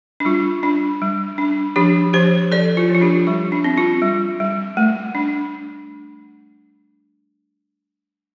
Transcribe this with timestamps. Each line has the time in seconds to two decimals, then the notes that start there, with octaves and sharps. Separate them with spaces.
0.20 D4
0.25 G3 F4
0.63 D4
1.02 G3
1.38 D4
1.76 F3 D4 G4
2.13 F3 G4 C5
2.51 F3 A4 D5
2.77 F4
2.89 F3
2.95 F4
3.01 D4 G4
3.27 G3 F4
3.52 D4
3.64 C4
3.78 F4
4.02 G3
4.40 G3
4.77 A3
5.15 D4